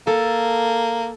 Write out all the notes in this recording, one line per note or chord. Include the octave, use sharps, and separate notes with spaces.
A#3 A4